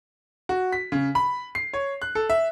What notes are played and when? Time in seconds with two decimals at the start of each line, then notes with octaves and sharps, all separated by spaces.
0.49 F#4
0.73 B6
0.92 C#3
1.15 B5
1.55 C7
1.73 C#5
2.02 F#6
2.15 A4
2.30 E5